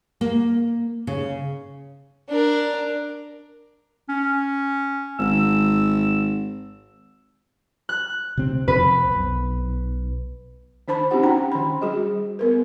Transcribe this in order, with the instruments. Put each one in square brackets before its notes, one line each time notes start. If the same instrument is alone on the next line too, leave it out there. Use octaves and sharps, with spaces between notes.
[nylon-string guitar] A#3
C#3
[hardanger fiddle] D4 A#4
[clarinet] C#4
[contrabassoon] G#1 [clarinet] E6
[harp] F#6
[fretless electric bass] C3 C4
[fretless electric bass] F2 C3 C4 [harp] B4
[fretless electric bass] B1
[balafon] D#3 D4 C5 A5 B5
C4 C#4 D#4 F#4 G4 F#5
C#4 D4 F#5 G5 A#5
D#3 B5
G3 F#4 G#4 D#5
B3 A#4 B4